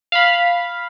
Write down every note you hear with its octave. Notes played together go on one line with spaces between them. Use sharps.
F5 B5